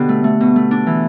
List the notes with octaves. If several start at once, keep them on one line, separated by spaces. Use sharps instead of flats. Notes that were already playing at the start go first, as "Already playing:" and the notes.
Already playing: B2 D3 D4 G4
A3
A3
B2
A3
D4
E3